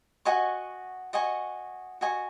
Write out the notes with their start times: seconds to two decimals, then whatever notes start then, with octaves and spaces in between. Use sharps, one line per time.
0.25 F#4 D#5 G#5 C#6
1.13 F#4 D#5 G#5 C#6
2.01 F#4 D#5 G#5 C#6